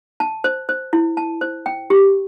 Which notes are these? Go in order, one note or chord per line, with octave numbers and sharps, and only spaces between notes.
A5
C5
C5
E4
A5
C5
G5
G4